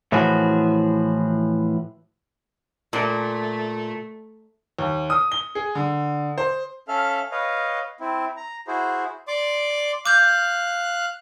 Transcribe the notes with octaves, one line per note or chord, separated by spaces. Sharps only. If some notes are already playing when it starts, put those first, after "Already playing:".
A2 E3 F3 F#4 G#4
A#2 A3
D#2
D#6
G7
G#4
D3
C5
C#4 A4 E5 F5 F6
B4 C#5 D#5 F5
C4 E4
A#5
E4 F#4 G#4 C5
D5 C6 D6
F5 D6 F#6 G6